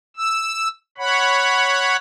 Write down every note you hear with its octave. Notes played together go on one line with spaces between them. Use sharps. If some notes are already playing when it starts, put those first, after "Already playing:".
E6
C#5 F#5 B5